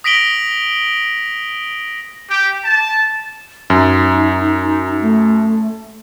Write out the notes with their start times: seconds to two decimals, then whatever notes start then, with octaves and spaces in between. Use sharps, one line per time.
0.04 D#6 A#6 B6 D7 F#7 G7
2.29 G4
2.64 A5
3.70 F#2 D#4
5.01 A3